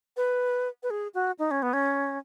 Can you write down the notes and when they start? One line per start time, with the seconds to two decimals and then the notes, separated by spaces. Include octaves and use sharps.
0.17 B4
0.83 B4
0.90 G#4
1.14 F#4
1.39 D#4
1.51 C#4
1.62 B3
1.73 C#4